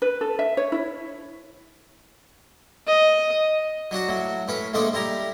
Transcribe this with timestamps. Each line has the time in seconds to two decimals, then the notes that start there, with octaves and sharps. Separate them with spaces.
0.02 B4
0.21 A4
0.39 E5
0.57 C#5
0.72 E4
2.87 D#5
3.91 F#3 D4 F#4
4.08 A2 F#3
4.48 A2 C#4 B4
4.73 A#1 G#3 A3 A4 D6
4.93 G3 E4 A#5